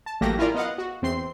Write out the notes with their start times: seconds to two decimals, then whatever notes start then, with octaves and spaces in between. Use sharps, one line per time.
0.06 A5
0.21 A1 F#3 A3 A#3 G4 A#6
0.38 C#4 E4 F4 A#4 D5
0.55 B3 D#5 F5 F#5
0.78 F#4
1.02 E2 C4 C6 C7